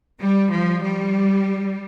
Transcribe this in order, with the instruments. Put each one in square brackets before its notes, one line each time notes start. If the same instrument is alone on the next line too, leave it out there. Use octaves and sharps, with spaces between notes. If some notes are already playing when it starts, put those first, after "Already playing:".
[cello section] G3
F3
G3